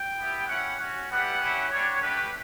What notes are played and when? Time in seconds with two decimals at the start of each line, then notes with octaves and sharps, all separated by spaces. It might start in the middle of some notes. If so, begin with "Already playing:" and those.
Already playing: G5
0.17 B3 E4 G4
0.47 C#4 E4 G4 F#5
0.78 C#4 F#4 F#5
1.09 G3 B3 E4 G4 F#5
1.39 C#4 E4 G4
1.70 G3 D4 G4 C#5
2.01 A3 D4 G4 B4